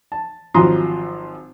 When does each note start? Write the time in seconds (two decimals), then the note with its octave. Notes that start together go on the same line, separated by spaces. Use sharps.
0.12 A5
0.54 G#1 F3 F#3 A#5 C6 D#6